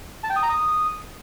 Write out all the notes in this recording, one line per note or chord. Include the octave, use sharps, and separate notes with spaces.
A5
G5
D#6
A#5
D#6